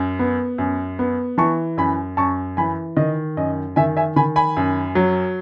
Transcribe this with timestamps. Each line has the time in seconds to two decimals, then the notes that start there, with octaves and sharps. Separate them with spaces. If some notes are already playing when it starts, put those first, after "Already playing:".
Already playing: F#2
0.19 B3
0.58 F#2
0.99 B3
1.38 E3 A5 C#6
1.78 F#2 G#5 B5
2.17 F#2 A5 C#6
2.57 E3 G#5 B5
2.97 D#3 D#5
3.37 F#2 D#5
3.76 D#3 E5 G#5
3.97 E5 G#5
4.16 D#3 G#5 B5
4.36 G#5 B5
4.57 F#2
4.95 F#3